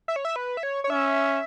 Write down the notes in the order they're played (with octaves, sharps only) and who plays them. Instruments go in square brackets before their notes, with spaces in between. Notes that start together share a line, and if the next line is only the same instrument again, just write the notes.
[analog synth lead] E5
C#5
E5
B4
E5
C#5
C#5
[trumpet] C#4 [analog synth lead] E5